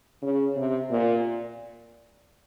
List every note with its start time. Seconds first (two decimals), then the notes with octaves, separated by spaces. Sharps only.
0.22 C#3
0.56 C3
0.91 A#2